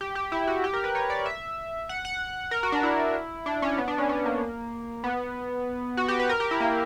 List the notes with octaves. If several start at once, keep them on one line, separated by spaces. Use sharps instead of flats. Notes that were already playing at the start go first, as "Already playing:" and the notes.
G4
G4
E4
F#4
G4
A#4
B4
C#5
D5
E5
F#5
F#5
A#4
F#4
D4
E4
D4
C#4
B3
D4
C#4
C#4
A#3
B3
F#4
G4
B4
A#4
G4
E4
A#3